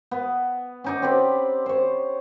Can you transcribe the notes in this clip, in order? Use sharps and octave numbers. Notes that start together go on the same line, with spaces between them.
B3
C#4 D#4 D5
C4 G4 B4 D5
C5 C#5